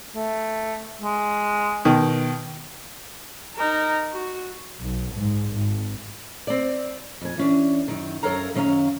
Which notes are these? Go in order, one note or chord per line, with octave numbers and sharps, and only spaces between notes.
A3
G#3
B2 D#3
D#4 A#4
F#4
B1
G#2
G#1
C4 D5
F2 G#5
E3 C#4 D4
F#2 D#3
F#2 A4 A#4 C#5 F5 A#5
F#2 D#3 C#4 F5 A#5